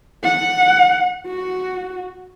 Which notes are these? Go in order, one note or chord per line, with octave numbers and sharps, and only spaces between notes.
F#5
F#4